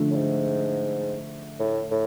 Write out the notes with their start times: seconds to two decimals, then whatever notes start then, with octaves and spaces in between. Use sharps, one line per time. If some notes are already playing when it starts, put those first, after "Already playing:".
Already playing: D3 F3 A3 D4
0.11 A2
0.15 G#2
1.60 A2
1.91 A2